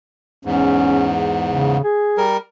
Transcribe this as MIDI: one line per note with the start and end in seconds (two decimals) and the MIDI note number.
0.45 1.77 40
0.45 1.77 44
0.45 1.12 61
1.49 1.81 49
1.84 2.23 68
2.18 2.37 55
2.18 2.37 70